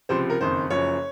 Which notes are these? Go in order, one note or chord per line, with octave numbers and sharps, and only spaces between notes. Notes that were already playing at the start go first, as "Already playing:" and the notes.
C#2 C3 F3 C5
A#4
F#1 F2 D#3 C5
F#1 F#2 F3 C#5